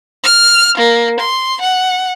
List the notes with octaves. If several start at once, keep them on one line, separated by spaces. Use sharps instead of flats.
F6
A#3
C6
F#5